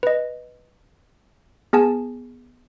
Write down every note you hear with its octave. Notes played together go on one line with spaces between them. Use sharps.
B4 D#5
B3 G#4 G#5 A5